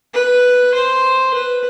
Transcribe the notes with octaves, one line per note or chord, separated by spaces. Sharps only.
B4
C5
B4